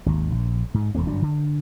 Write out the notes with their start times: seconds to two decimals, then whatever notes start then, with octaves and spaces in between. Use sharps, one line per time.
0.06 G#1 D#2
0.33 A#1
0.74 G#2
0.95 E1 E2 A3 C4
1.07 G1 F#2 F#3 D4
1.22 D3